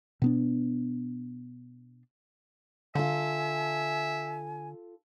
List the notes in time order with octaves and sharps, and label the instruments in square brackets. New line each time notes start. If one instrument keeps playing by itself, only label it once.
[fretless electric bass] B2 B3 D4
[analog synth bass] D3 [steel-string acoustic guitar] F4 A4 [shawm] E5 [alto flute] G#5